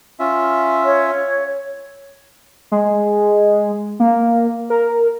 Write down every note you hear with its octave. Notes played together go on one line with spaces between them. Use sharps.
C#4 F4 E5
C#5
G#3
A#3
A#4